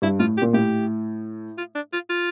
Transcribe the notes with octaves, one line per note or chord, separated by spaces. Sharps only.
G2 E4
A2 F4
G4
A#2
A2 G4
F4
D4
F4
F4